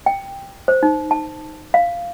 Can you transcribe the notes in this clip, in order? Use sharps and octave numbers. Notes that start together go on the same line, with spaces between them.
G5
C5
D#4
A5
F5